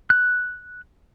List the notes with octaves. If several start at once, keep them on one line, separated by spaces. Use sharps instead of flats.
F#6